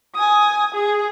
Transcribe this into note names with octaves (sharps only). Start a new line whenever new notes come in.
G#5 D#6
G#4